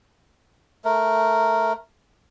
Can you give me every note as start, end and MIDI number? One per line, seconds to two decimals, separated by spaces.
0.85 1.73 57
0.85 1.73 70